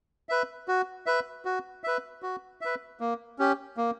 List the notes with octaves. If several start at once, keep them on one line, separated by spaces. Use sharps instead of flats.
B4 E5
F#4
B4 E5
F#4
B4 E5
F#4
B4 E5
A#3
C#4 G4
A#3